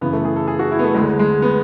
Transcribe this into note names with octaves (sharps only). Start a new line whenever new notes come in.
F#2 C#3 E3 B3
A3
G#4
A4
G#4
F#4
E4
B3
A3
D2 D3 G#3
G#3
B3